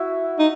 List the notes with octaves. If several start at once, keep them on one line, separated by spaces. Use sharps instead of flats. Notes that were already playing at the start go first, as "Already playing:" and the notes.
Already playing: E4 F#4
D#4